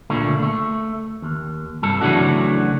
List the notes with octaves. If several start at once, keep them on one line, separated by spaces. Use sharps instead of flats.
C#2 A#2 D3 A3
A3
D#2
C2 G2 A4
C#3 E3 F#3 A3 D4 F#4